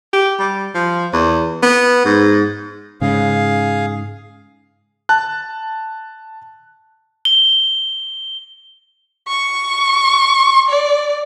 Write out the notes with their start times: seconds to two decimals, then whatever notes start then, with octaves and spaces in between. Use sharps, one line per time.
0.13 G4
0.39 G3
0.75 F3
1.13 E2
1.62 B3
2.05 G#2
3.01 G#2 C#3 G#4 F5
5.09 A5 F#6
7.25 G7
9.27 C#6
10.68 D5